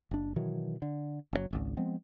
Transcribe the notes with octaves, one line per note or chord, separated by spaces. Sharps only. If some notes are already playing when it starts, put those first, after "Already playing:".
F#1 D4
B2 D#3 E3 F#3
D3
F#1 C#3 F#3
D1 G#1 C#2
F3 G#3 B3 C4